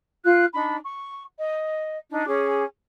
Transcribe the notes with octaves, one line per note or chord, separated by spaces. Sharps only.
F4 F#6
D4 D#4 B5
C#6
D#5
D4 D#4
C#4 G#4 D6